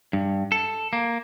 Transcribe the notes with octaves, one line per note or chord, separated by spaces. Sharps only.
G2
A4
A#3